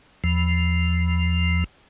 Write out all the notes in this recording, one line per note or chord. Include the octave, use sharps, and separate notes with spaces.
E2 F3